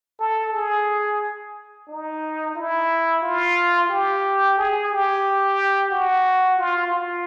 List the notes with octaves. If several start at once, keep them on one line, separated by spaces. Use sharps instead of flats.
A4
G#4
D#4
E4
F4
G4
G#4
G4
F#4
F4
F4